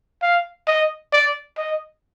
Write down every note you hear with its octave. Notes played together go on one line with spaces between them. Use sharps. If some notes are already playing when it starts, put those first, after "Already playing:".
F5
D#5
D5
D#5